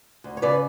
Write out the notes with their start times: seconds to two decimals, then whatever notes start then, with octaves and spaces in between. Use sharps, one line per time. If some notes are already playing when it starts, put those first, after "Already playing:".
0.24 D2
0.37 C#5
0.42 C#3 B4 D5